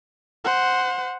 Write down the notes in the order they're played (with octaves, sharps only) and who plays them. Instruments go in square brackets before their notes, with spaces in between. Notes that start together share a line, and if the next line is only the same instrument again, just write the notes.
[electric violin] C5 F#5